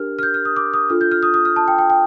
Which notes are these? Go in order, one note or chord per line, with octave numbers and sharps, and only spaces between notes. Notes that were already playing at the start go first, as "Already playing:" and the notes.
Already playing: D4 G4 A#4 F6
F6
G6
F6
D#6
D6
D#6
D4 F4 A4 F6
G6
F6
D#6
D#6
F6
A5
G5
G5
G5